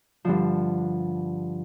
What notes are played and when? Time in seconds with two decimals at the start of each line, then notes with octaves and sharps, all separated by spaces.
0.25 G2 D3 F3